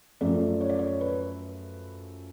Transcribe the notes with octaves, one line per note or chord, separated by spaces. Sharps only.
F#2 F3 A3 D5
C#5
D5
C#5
B4